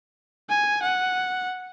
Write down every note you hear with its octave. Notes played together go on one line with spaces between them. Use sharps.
G#5
F#5